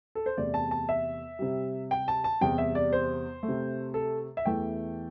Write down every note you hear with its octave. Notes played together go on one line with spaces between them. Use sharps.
A4
C5
E2 C3 A3 D5
A5
A5
E5
C3 G3
G5
A5
A5
E2 C3 G3 G5
E5
D5
C5
A3
C3
A4
E5
E2 E3 A3 G5